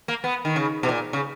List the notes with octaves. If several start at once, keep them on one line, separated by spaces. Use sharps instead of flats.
A#3
B3
D#3
C#3
B2
A#2
C#3